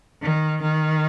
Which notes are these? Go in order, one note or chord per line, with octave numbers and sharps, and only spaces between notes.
D#3
D#3